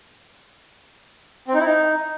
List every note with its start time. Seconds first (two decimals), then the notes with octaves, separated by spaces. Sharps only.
1.48 C4
1.54 D#4
1.60 E4
1.66 D#4